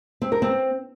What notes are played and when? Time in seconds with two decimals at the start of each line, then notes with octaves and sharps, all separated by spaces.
0.22 C4
0.32 A#4
0.42 C4